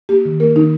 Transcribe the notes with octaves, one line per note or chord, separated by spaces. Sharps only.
A#3 G4
D#3
A#3 A#4
D#3 D#4